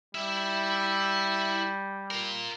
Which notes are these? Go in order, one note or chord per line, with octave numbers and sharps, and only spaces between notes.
G3 E4 E5
F4 A#4